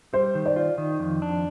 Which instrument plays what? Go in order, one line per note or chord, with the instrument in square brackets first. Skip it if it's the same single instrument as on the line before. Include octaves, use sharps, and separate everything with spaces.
[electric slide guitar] G3 [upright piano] C5
[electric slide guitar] D#3
[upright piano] D5
[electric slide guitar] F4
D#3
F2
D4